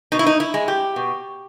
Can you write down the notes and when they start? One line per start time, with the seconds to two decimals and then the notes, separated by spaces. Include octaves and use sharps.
0.12 B2 D#4
0.19 E4
0.27 D#4
0.40 E4
0.54 G#3
0.68 G4
0.96 B2